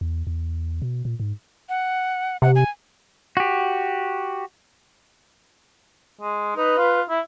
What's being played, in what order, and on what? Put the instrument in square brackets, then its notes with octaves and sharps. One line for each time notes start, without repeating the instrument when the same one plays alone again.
[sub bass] E2
E2
B2
A#2
G#2
[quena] F#5
[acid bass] C3 [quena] F#5
[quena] G#5
[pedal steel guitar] F#4 G4
[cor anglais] G#3
[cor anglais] D#4 [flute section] B4
[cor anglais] F4
E4